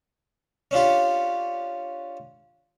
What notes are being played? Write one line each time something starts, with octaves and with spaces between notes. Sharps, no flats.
C#4 D4 F4 G4